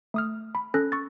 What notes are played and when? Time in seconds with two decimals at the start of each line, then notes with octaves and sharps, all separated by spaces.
0.14 A3 D#6 F6
0.55 B5
0.74 C#4 A4 F#6 A#6
0.92 C#6 E6 A6